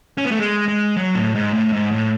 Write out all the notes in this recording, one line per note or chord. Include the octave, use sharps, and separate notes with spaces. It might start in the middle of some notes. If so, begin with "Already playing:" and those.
C#4
B3
A3
G#3
G#3
F#3
A2
G#2
A2
G#2
A2